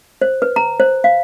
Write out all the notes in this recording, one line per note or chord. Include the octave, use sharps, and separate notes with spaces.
C5
B4
A#5
C5
F5